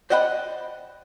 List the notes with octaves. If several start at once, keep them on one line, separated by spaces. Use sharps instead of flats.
C5 D5 D#5 F#5 G5 B5